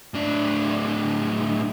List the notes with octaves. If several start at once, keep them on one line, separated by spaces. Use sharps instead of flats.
A2 D4